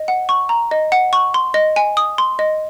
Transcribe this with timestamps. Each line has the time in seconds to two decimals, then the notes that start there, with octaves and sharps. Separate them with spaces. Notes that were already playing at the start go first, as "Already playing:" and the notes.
Already playing: D#5
0.08 F#5
0.29 C#6
0.49 A#5
0.71 D#5
0.92 F#5
1.13 C#6
1.34 C6
1.54 D#5
1.76 G#5
1.97 D#6
2.18 C6
2.39 D#5